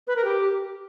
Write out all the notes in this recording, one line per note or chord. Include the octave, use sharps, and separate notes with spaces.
B4
A#4
G4